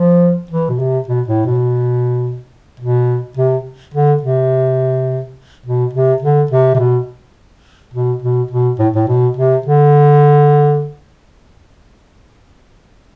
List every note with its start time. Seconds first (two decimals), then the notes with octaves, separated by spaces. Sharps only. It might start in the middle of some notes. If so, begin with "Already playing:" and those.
Already playing: F3
0.51 E3
0.69 B2
0.79 C3
1.08 B2
1.27 A2
1.46 B2
2.80 B2
3.37 C3
3.94 D3
4.23 C3
5.66 B2
5.93 C3
6.22 D3
6.51 C3
6.74 C3
6.79 B2
7.93 B2
8.23 B2
8.51 B2
8.79 A2
8.95 A2
9.08 B2
9.37 C3
9.66 D3